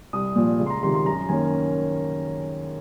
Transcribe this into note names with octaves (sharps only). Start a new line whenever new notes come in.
C2 D#6
A#2 F3
C#2
C6
A#5
C3 D#3 C6
C6
F#2 A#5
D#3 A#3 C#4 G#5